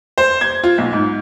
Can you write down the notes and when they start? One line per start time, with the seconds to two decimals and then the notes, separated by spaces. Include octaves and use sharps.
0.18 C5
0.41 G#6
0.64 F4
0.78 B1
0.93 G#2